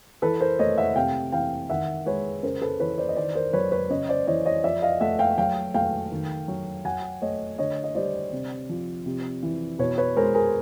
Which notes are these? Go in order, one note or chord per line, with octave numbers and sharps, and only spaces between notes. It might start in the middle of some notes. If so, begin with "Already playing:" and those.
E3 A4 B4
A#4 C5
A3 C#5 D#5
E5 F#5
C3 F5 G5
E3 F5 G5
D#3 E5 F#5
G#3 B4 C#5
C#3 A#4 C5
A4 B4
E3 B4 C#5
C5 D5
D#5
D#3 C5 D5
A#4 C5
F#3 B4 C#5
B4 C#5
C#3 C#5 D#5
C5 D5
E3 C#5 D#5
C#5 D#5
F3 D5 E5
D#5 F5
A3 E5 F#5
F5 G5
F#3 F5 G5
A3 F5 G5
D#3
F#3
F#3 F#5 G#5
A3 C#5 D#5
D3 C#5 D#5
D#5
G3 C5 D5
C3
F3
C3
E3
B2 B4 C#5
B4 C#5
G#3 A#4 C5
G#4 A#4